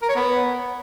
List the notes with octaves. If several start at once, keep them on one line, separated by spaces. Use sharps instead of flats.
A#4
C#5
B3